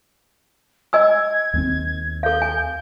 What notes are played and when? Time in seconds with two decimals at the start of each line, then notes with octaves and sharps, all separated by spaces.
0.93 D#5 G#5 E6 G#6
1.54 D#2 G3 C4
2.23 A4 F5 G6
2.42 G#5